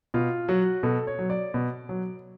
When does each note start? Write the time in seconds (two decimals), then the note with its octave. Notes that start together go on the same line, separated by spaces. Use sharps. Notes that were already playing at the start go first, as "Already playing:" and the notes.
0.14 B2 F4
0.49 F#3 F#4
0.83 B2 A4
1.07 C#5
1.19 F#3
1.30 D5
1.54 B2
1.89 F#3